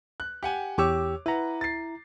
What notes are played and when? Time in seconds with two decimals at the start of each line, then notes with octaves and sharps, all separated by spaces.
0.20 F#6
0.43 G4 F#5 G#5
0.78 E2 G4 C#5 C#6 D6 E6
1.26 E4 B4 F#5 A#5
1.61 A6 C7